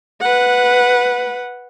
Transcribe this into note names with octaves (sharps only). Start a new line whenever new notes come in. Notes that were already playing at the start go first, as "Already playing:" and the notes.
B4 F#5